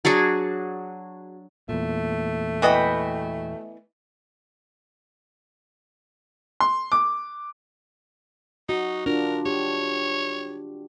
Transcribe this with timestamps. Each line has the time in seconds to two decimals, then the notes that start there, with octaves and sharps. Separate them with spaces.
0.05 F#3 D4 F#4 G#4
1.69 E2 A#2 A3
2.62 E3 B3 F#4 D#5 G5 B5
6.60 C6
6.92 D6
8.69 D#4 F#4
9.06 D4 F4 A#4
9.46 G4 C#5